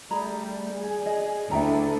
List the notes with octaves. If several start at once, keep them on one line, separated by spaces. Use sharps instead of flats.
G3 A3 G#4 D5 A#5 B5
G#4
D#5
D2 E4 A4 E5 G5 A#5